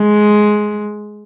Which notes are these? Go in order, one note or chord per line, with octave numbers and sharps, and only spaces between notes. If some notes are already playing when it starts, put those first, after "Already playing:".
Already playing: G#3